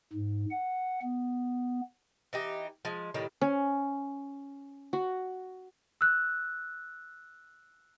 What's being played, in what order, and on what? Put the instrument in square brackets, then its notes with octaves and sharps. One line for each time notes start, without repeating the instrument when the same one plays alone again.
[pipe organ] G#2
F#5
B3
[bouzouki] E3 D#4 G4
F3 G#3
A2 D#3 G3
[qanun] C#4
F#4
[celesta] E6 F#6